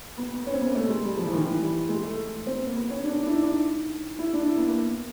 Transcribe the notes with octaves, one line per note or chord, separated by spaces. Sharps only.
B3
B3
C#4
C4
B3
A#3
A3
G#3
G3
F3
E3
D#3
E3
G3
G#3
A3
C4
B3
A#3
B3
C#4
D4
D4
E4
D#4
D4
D#4
E4
D4
E4
B3
A#3